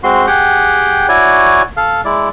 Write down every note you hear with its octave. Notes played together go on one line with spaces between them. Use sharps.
G#3 C4 F#4 C6
G4 G#4 F#5 G5
E4 F#4 C#5 D5 G#5
A4 F5
G#3 E4 D5